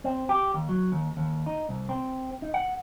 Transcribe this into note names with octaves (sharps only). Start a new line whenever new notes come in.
C4
G4
D#2
F#3
D#2
D#2
D#4
C2
C4
D#4
F#5